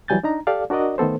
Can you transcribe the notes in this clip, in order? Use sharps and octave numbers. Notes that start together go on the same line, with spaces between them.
E3 F#3 G3 G#5 G6 A6
D4 D#4 A#5
G4 A4 D5 F5
D4 F#4 A#4 D5 D#5
D#3 A3 B3 A4 C5